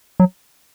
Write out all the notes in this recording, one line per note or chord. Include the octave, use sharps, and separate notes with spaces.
F#3